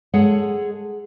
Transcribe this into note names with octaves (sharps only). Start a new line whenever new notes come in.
G#3 G#4 A4 C#5 F#5